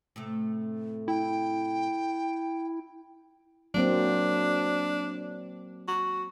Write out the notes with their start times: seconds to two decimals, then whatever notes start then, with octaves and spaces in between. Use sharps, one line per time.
0.16 A2 C3 A3
1.08 E4 G5
3.74 F#3 A#3 C4 D4
5.88 F#4